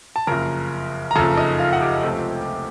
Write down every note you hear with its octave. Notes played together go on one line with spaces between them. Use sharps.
A5
F#1 F2 C#3 A#4 A#5
A#5
F#1 F2 C#3 A4 A5
D#4 D#5
F4 F5
F#5
G4 G5
C#2 C3 F3 A3 C4